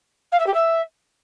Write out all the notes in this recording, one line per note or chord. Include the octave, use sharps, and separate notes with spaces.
F5
E5
G4
E5